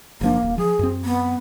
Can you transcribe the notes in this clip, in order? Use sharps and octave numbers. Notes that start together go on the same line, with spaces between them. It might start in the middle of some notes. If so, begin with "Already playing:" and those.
F#1 F3 A#3 D4
D#1
F3 G#4
F#2 C4
B3